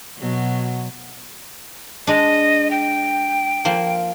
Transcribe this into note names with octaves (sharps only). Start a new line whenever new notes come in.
B2 F#3
G#3 D4 D#5
G5
F3 A#3 C5